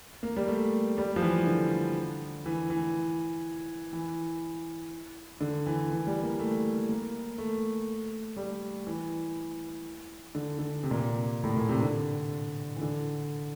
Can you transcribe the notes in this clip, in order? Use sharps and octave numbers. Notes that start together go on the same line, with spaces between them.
A#3
G3
A3
G3
F3
E3
D3
E3
E3
E3
D3
E3
E3
G3
A#3
A3
A#3
A3
G3
E3
D3
D3
C3
A#2
C3
A2
A#2
C3
D3
E3
D3